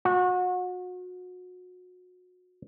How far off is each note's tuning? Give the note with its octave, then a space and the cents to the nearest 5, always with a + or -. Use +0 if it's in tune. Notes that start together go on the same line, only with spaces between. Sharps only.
F#4 -30